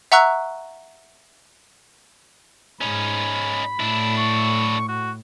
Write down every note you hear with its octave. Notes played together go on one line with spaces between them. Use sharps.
E5 F#5 A#5 C#6 E6 F#6
G#2 C#4 D#4 B5
A2 D4 E4
C#6
F#4